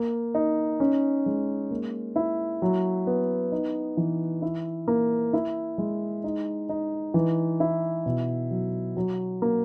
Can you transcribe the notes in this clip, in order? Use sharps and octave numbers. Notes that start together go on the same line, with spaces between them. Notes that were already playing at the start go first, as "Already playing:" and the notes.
Already playing: A#3
D#4
C#4
G#3
A#3
E4
F#3
B3
D#4
E3
E4
A#3
E4
G#3
D#4
D#4
E3
E4
B2
F#3
F#3
A#3